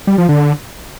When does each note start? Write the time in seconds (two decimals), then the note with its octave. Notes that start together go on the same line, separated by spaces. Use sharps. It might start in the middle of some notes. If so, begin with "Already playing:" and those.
0.07 G3
0.18 F3
0.29 D3